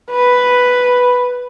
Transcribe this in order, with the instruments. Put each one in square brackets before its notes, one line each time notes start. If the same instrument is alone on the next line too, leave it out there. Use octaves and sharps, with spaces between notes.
[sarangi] B4